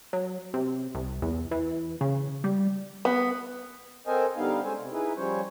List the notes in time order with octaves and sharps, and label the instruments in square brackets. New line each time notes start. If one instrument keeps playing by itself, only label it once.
[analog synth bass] F#3
C3
C2
E2
E3
C#3
G3
[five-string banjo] B3
[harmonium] C4 A4 A#4 C5 D#5 G#5
D3 G3 B3 D#4 F5
G#3 C#4 A4 C5 G#5
C3
D#4 E4 G#4 B4
F3 G3 C#4 C5 C#5